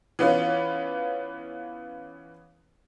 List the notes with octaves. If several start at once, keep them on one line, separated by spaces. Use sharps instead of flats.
E3 B3 C#4 F4